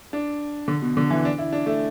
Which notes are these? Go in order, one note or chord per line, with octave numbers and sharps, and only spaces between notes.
D4
D3
B2
D3
E3
D4
E4
D4
A3